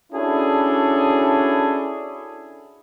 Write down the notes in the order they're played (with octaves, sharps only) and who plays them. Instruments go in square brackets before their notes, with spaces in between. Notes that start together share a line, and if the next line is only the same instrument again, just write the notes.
[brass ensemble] C#4 D4 E4 F#4 G#4 A4